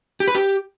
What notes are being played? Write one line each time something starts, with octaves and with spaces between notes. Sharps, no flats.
G4
B4
G4